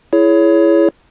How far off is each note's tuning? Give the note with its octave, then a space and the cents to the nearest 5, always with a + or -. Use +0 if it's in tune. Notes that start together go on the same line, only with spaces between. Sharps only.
E4 +15 G#4 +20 C#5 +15